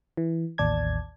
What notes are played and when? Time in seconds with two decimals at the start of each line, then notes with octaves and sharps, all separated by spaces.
0.17 E3
0.58 A1 D#2 D5 A5 G#6